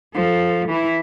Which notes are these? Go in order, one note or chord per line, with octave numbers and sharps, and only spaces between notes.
F3 A4
E3 E4